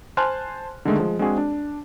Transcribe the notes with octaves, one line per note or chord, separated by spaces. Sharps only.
C5 G#5 A5 C6 F6 F#6
D3 D#3 G#3 A3
F3 G#3
G#3 C4 D4 F#4 G#4
D4